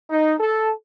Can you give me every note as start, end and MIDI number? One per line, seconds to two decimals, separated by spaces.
0.10 0.34 63
0.39 0.71 69